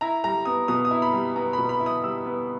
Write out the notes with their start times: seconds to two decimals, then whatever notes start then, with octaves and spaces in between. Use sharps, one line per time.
0.01 E4 A#5
0.24 G3 A#5
0.45 B3 D#6
0.68 B2 D#6
0.85 D#6
0.91 E4
1.02 B5
1.13 G3
1.36 B3 A#5
1.53 B5
1.58 B2
1.69 B5
1.80 E4
1.86 D#6
2.03 G3 E6
2.26 B3